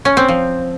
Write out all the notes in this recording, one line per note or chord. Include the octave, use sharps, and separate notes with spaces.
C#4
C4
F3